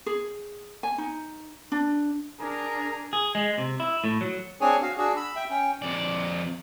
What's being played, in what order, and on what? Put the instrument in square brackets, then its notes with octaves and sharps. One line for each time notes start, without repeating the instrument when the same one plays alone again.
[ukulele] G#4
G#5
D#4
D4
[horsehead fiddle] D4 A#4 [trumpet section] G#4 A#5
[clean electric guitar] G#4
G#3
C3
E4
A2
F#3
[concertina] C4 D4 G#4 C#5 G#5
F#4 F5
D4 F#4 G#4
B5 E6
E5 G5
C#4 G5
[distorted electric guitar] F2 D5